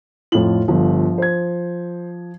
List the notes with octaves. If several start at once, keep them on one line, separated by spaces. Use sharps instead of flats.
F2 A2 F4 F#7
G1 F3
C5 G#6